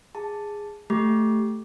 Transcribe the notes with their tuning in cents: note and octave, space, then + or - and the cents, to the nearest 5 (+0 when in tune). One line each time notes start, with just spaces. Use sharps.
G#4 -10 A5 +0
A3 +0 G4 -5